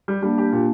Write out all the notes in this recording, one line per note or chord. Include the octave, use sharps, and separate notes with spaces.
G3
G3 A#3 D4
G4
A#2